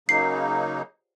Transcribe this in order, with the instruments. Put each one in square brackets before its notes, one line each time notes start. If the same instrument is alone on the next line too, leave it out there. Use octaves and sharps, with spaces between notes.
[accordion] C#3 F#3 A#3 D#4 [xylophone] C7